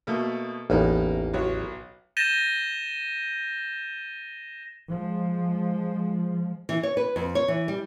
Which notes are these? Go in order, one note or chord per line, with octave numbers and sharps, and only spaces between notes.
B2 A3 A#3
A1 E2 A#3 B3 D#4
B1 F#4 C#5
G6 A6 A#6 D#7 E7 G7
F3 G#3
E3
C#5
B4
F2
C#5
E3
G3